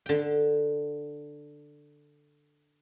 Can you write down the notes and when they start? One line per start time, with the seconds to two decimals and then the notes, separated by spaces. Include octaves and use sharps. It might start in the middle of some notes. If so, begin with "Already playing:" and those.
0.06 D3 G5